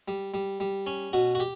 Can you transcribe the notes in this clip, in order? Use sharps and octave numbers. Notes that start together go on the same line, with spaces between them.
G3
G3
G3
C#4
B2 F#4
F#4
G4